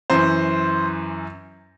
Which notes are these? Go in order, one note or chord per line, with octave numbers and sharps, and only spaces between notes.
F#2 E3 C5